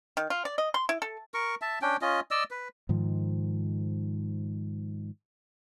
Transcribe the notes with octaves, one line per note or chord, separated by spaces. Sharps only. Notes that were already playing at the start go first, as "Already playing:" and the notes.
D#3
F4
D5
D#5
C6
E4
A4
A#4 C#6
E5 A5
C#4 D4 G5
C#4 F4 D#5
D5 D#5 E6
B4
G#2 D#3 F3